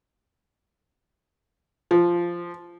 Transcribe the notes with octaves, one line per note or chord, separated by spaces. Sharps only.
F3